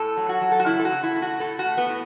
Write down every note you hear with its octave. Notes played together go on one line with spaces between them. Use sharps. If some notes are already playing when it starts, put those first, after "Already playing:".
Already playing: A2 A4
F#3
F#4
F#3
A4
F#4
C#3 E4
A4
F#4
C#3
E4
A3
F#4
A2 A4
F#4
A3
B3
A2